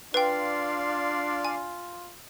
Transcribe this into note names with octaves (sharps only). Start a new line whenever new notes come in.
D4 F4 B4 D5 F5 G5 C6
G#5